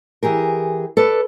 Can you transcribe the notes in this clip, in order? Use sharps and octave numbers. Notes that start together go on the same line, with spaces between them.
E3 G4 G#4 A#4
A4 B4 D5